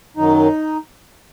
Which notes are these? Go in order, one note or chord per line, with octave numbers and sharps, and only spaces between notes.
F#2 D#3 F#3 D#4